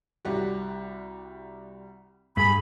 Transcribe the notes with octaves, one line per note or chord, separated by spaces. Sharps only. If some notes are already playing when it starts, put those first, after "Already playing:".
C2 G3 F#4
G2 G#4 B5